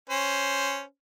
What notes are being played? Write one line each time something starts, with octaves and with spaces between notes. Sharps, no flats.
C#4 C5